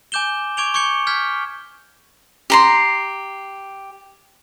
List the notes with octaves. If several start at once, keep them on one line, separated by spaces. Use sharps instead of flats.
G#5 D6 G6 E7 G7
C#6 D6 G#6 D7 F7 G7
C#6 D6 G6 G#6 C#7 G7
F6 G6 G#6 B6
G4 A#5 C6